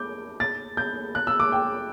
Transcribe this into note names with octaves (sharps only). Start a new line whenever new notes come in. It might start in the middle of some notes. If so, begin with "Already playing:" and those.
Already playing: D6 G6
A6
G6
F#6
E6
D6
G5